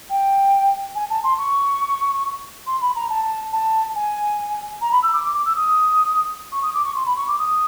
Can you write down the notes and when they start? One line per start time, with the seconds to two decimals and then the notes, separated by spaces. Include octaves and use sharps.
0.10 G5
0.95 G#5
1.10 A5
1.24 C6
1.38 C#6
2.67 C6
2.81 B5
2.96 A#5
3.10 A5
3.53 A5
3.96 G#5
4.82 A#5
4.92 B5
5.03 E6
5.13 D6
5.24 D6
5.34 D6
5.46 E6
5.56 D#6
6.52 C#6
6.63 D#6
6.74 D6
6.85 C#6
6.95 C6
7.06 B5
7.17 C#6
7.28 D6
7.39 D#6